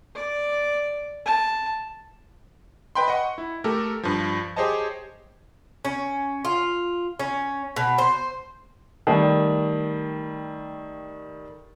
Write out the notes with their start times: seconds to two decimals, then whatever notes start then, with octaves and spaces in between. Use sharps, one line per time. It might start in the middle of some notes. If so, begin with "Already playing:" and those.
0.15 D5
1.26 A5
2.95 B4 D#5 G5 B5 C6
3.08 D#5 F#5 C#6
3.38 E4
3.64 A3 G4 A4 A#4
4.03 G2 F3
4.56 G4 G#4 C5 C#5 D#5 A5
5.85 C#4
6.45 F4
7.20 C#4
7.76 B2
7.98 C5
9.07 D#3 G3 A3